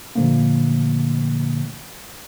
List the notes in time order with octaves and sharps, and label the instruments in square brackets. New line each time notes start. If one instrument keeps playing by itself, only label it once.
[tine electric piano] A#2 D3 F3 A3 A#3